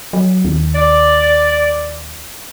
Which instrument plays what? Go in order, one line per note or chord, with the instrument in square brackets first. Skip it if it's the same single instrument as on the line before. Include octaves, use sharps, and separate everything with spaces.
[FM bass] F#3
D#2
[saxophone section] D5